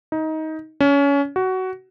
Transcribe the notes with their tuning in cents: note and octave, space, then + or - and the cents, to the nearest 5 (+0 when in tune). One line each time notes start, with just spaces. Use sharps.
D#4 +20
C#4 +25
F#4 +15